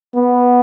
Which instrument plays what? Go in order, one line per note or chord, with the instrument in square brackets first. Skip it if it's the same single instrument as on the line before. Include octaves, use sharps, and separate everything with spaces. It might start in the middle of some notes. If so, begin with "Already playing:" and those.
[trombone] B3